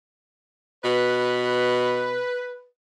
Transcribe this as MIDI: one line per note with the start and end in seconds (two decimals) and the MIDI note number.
0.84 2.23 47
0.84 2.66 71